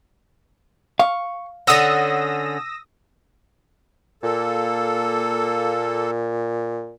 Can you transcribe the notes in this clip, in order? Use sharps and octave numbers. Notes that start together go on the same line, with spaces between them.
F5 C#6
D3 C#4 F#5 D#6 E6 A#6
A#2 A#3 A4